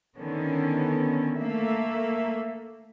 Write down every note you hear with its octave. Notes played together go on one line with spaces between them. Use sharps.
D3 D#3 B3 C#4
A3 A#3 E5